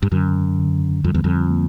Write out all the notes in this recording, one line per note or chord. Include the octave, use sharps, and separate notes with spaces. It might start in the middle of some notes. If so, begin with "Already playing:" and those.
G2
F#2 D3
D3
F2 G3
E2
F2
A#3